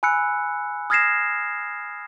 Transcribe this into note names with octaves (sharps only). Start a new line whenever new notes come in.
G#5 B5 E6 F#6 C#7
D#6 F6 G#6 A#6 C7 E7